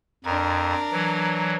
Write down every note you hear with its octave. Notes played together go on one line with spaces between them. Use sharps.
F2 D4 A#4
E3 F#3